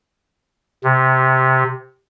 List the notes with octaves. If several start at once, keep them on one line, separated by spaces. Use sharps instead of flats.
C3